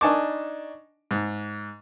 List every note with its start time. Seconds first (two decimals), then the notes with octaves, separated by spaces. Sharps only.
0.01 D4 D#4 G#5 A5 C#6 D6
1.11 G#2